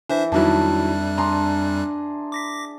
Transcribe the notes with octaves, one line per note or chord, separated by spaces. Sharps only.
E3 D4 C5 E5
F2 D#3 F#3 G3 D4 E4 F#6
D4 G#4 A#5 C6
D6 A#6 B6